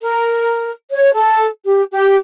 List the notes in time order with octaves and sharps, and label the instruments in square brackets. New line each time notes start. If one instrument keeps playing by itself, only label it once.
[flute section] A#4
C#5
A4
G4
G4